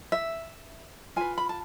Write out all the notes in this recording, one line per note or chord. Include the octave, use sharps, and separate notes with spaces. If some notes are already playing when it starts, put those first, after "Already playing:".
E5
F4 B4 G#5
B5
A5